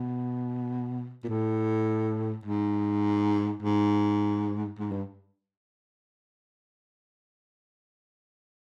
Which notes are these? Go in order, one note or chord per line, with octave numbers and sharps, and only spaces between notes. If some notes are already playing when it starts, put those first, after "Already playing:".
Already playing: B2
A#2
A2
G#2
G#2
G#2
G2